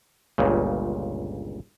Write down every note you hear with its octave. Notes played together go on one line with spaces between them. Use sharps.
G1 C#2 A#2 C#3